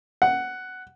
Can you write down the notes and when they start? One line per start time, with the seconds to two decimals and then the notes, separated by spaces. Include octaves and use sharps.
0.22 F#5